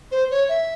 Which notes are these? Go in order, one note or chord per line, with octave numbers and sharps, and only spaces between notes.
C5
C#5
E5